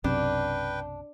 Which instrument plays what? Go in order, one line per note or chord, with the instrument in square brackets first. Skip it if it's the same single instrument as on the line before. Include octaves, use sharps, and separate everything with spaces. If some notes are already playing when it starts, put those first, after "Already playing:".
[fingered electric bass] B1 F#2 C3 [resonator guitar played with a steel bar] D4 [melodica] B4 G5